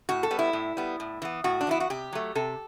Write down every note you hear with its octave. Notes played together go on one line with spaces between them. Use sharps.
A2 F#4
A4
G3 B3
E4
A2
G3 B3
A2
E3 B3
A2 F#4
D4
E3 B3 E4
F#4
C3 G4
F#3 A3
C3 A4